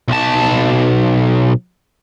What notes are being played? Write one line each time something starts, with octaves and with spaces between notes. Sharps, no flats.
B1 A5